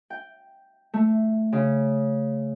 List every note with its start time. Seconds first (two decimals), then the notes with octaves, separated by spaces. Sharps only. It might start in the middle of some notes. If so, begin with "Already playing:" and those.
0.10 G5
0.94 A3
1.52 C#3